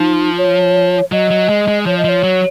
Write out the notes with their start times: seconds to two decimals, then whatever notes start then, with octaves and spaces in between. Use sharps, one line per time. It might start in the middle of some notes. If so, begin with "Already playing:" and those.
Already playing: F3 D#4
0.38 C#5
1.12 F#3 D#5
1.30 F#3
1.49 G#3
1.68 G#3
1.86 F3 C#5
1.98 D#5
2.04 F3 C#5
2.23 F#3